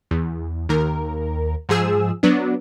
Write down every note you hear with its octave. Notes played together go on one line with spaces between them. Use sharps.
E2
D#2 A#4
G#2 F3 G#4 E6
F#3 B3 D4